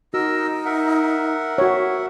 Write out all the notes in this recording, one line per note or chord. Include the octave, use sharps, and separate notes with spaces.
D#4 F#4 A#4 D#5 E6
A#4 E5 F#5
F#4 C#5